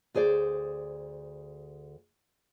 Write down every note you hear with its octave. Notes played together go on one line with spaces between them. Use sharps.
D2 G#4 C5 D5